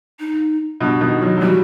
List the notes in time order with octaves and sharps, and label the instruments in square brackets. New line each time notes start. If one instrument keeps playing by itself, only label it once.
[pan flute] D#4
[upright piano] G2 B2
B2 D#3
D#3 F#3
F#3
[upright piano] E3 G3 [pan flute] F#4